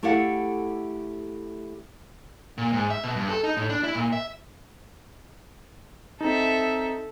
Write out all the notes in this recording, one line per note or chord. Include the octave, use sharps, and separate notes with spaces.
A3 E4 G4 A4 F5 F#5
A#2
G#2
E5
B2
G2
A4
D#4
A2
D4
E4
A#2
E5
C4 D#4 A4 E5